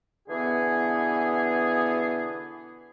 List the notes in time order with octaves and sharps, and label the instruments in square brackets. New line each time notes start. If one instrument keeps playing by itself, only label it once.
[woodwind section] B2 D3 E3 B3 G#4